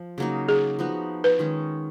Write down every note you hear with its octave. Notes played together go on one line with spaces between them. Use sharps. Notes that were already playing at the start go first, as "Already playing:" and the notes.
Already playing: F3
C#3 F#3 A#3 D#4
G#4
F3 B3 D#4 F#4
B4
D#3 G#3 C#4